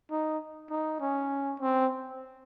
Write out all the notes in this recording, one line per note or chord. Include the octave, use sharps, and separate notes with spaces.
D#4
D#4
C#4
C4